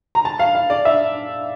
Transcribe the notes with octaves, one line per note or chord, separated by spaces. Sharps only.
A#5
A5
F5
F5
D5
E5